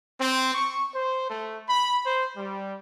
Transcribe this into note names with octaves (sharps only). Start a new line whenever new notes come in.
C4
C#6
C5
A3
B5
C5
G3